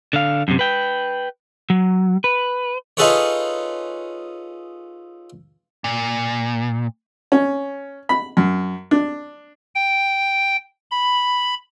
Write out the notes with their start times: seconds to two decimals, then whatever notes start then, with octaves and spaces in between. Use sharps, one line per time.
0.13 D3 F5
0.48 F#2 C3
0.59 B4 G5
1.70 F#3
2.24 B4
2.97 D#4 F4 G#4 A4 B4 C#5
5.84 A#2
7.32 C#4
8.09 B5
8.37 F#2
8.91 D4
9.75 G5
10.91 B5